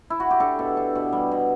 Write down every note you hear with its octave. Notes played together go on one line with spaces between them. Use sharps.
E4
F#4
G4
D4 A4
B2
D4
B2
G3
B2